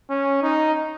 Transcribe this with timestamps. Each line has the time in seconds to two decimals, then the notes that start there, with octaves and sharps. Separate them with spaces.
0.10 C#4
0.43 D#4